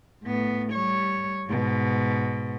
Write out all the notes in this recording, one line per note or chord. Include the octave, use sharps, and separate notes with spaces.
A2 B3
G3 C#5
G#2 B2